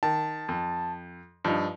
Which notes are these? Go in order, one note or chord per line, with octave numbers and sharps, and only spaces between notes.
D#3 A5
F2
G2 F3 D#4